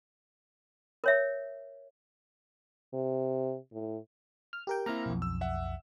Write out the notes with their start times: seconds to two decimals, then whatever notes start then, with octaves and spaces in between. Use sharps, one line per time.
1.04 A#4 C#5 E5
2.93 C3
3.73 A2
4.53 F6
4.67 G4 A#4 G5
4.86 A#3 C4 E4 A#5 F6 A#6
5.06 B1 F2
5.22 E6
5.41 E5 F#5